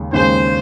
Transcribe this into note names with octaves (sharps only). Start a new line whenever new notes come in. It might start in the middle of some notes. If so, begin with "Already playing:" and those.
Already playing: D#2 C#3 G#3
D#2 C#3 G#3 C5